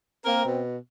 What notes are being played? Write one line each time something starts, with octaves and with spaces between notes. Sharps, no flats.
A#3 C4 A#4
B2